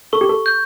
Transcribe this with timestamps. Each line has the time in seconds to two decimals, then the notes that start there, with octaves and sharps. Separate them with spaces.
0.13 A4 C#6
0.21 G4
0.29 A4
0.46 G6